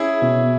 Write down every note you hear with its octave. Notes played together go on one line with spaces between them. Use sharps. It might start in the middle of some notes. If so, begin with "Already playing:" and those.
Already playing: C#4 E4 G#4
B2